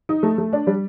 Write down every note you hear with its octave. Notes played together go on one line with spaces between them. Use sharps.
D#4
A3
A3
D4
G3